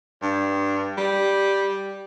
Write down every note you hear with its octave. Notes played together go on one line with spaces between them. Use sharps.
G2
G3